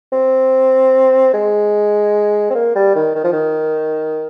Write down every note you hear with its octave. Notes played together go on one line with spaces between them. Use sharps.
C4
G#3
C4
A#3
G3
D#3
D#3
F3
D#3